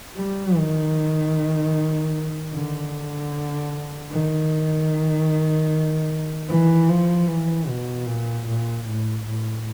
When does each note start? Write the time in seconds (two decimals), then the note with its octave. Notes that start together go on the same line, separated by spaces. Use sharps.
0.17 G3
0.57 D#3
2.54 D3
4.11 D#3
6.48 E3
6.89 F3
7.27 E3
7.68 B2
8.06 A#2
8.47 A#2
8.86 A2
9.25 A2